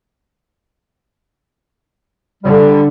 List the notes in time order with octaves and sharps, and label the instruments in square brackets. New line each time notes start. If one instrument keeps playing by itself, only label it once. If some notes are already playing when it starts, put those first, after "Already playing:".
[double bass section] D3 [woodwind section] G3